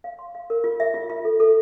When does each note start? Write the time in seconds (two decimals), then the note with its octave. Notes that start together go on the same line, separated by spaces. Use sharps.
0.04 F5
0.19 C6
0.35 F5
0.50 A#4
0.64 F4
0.80 E5
0.94 F4
1.10 F4
1.25 A4
1.40 A4